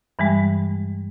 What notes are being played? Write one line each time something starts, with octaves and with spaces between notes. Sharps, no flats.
G2 E3 G3 G#3